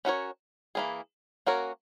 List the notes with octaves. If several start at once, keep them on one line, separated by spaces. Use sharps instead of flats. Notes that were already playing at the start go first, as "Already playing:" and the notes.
C#4 F#4 A#4 C#5
E3 A#3 C#4 E4 G#4
A#3 C#4 F#4 A#4 C#5